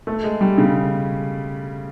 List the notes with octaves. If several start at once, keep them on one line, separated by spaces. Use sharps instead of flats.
A3
G#3
G3
C#3